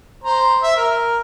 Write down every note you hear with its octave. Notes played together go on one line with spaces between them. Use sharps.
C5 A#5
E5
A#4